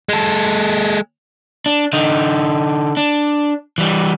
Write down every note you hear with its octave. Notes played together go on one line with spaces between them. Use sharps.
G#3 A4
D4
D3 D#4
D4
E3 G3